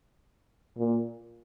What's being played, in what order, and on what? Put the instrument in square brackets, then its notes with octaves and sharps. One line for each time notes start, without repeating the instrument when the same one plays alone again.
[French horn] A#2